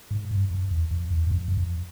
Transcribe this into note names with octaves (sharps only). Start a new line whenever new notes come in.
G#2
G2
F#2
E2
F2
E2
F#2
F2
F#2
F2